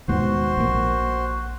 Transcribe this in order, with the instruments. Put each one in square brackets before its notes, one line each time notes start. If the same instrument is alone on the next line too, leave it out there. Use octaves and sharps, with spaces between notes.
[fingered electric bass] D#2 G#2 B2 [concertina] F#4 C5
[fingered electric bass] A#1 A#3